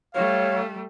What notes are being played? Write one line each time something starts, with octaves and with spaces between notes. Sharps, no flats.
G3 A3 C#5 F5